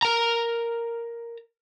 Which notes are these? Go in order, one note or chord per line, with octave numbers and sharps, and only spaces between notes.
A#4 A#5